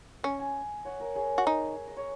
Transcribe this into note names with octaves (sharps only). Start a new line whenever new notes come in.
C#4 D#5 G#5
D#5 G#5
C#5 F#5
A#4 D#5
G#4 C#5
F#4
D#4
D#5
C#5